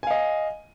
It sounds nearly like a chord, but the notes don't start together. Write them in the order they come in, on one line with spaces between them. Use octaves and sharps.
G#5 F5 D#5